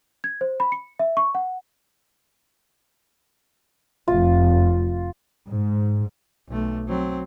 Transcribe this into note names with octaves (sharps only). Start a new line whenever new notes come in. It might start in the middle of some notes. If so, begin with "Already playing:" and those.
G#6
C5
B5
C#7
E5
C#6
F#5
F1 F4
G#2
B1 A3
F#3 C4